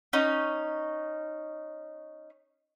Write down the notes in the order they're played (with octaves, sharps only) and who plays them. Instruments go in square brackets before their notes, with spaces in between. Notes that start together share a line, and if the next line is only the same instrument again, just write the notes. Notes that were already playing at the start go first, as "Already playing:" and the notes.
[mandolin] C#4 D#4